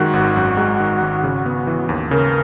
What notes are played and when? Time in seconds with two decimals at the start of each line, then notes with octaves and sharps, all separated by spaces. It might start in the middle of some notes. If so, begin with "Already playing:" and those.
Already playing: F#2 D#3 G#3 F#4
0.13 G#1
0.36 F#2
0.57 G#3
0.80 D#3
1.02 G#1
1.23 C#3
1.46 B3
1.67 E3
1.89 D#2
2.11 C#3 A#4